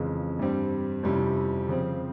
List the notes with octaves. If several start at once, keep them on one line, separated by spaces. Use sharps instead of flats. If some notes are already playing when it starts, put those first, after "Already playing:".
Already playing: F2 C#3 E3 G#3
G2 G3 C4
F2 C3 G3 C#4 E4
C#3 F3 C4